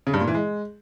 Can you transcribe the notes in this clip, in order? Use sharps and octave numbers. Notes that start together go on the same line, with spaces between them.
C#3
G2
A#2
E3
G#3